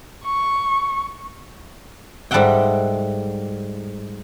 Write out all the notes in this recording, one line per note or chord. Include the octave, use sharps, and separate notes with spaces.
C#6
G#2 G3 A4 E5 F#5 G5